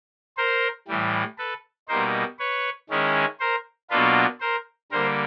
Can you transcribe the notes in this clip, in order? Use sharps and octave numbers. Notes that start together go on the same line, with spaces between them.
A#4 C5
A2 E3 G3
A4 B4
B2 G3 A#3 D#4 A#4 C5
B4 C#5
D#3 G#3 C#4 E4
A#4 C5
B2 F#3 A#3 D4 F4 A4 B4
A#4 C5
D3 G3 A#3 A#4 C5